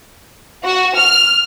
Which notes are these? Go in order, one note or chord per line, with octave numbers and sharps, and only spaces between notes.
F#4
F6